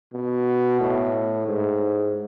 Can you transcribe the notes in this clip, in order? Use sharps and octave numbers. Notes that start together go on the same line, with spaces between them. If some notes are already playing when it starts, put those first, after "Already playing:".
B2
A2
G#2